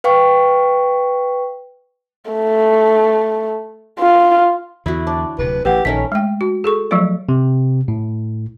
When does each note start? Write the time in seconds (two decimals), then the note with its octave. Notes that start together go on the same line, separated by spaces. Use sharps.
0.04 B4 F5 G5 C#6
2.32 A3
4.00 F4
4.86 E2 D3 E4 F#4
5.07 D4
5.38 D1 C3 B4
5.65 A1 G4 B4 F#5
5.85 A#1 D#3 A3 C#4 A#4 B6
6.12 G#3 A3 G5
6.41 F#4
6.64 G#4 A4 C#6
6.91 F3 F#3 A3 F4 D5
7.29 C3
7.88 A2